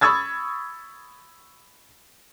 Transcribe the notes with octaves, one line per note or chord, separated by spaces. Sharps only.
B5 C#6 D#6 E6 G#6 A6